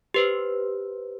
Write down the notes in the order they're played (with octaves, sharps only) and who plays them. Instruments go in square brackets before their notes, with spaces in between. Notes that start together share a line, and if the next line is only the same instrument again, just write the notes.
[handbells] G4 B4 C5